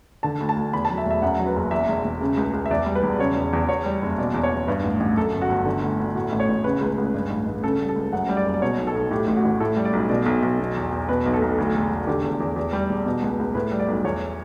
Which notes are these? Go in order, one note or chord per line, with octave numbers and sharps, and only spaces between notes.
D3 A5
D2
A5
D2
E2 B5
A5
F#3
E5
E1
E5
F#2 F#5
F#3
B4
F#1
E2 E5
E1
E1
C#3
C#2
C#2
E5
E2 D5
G3
B4
E1
C#3 C#5
E2
E2
E2 C#5
G3
F#1
B2 D5
E2
C#5
E2
G2 B4
A1
A1
F#2 A4
G1
F#4
G1
D3
D2
D2
A2 F#4
A1
C#5
A1
C#3 B4
C#2
C#2
G2
A1
A1
C#3 A4
G3
A4
C#2
F#2 F#5
G3
D5
F#1
D5
B2 C#5
B1
A4
B1
A2 G4
A1
F#4
A1
A2 A4
G3
D5
B1
B2 D5
B1
B1
B2
E2
E2
B2 B4
B1
A4
B1
D2
E1
E1
D3 G4
E2
E2
E2
G3
E1
B2
C#2
C#2
A2 B4
G3
D5
B1
E2 C#5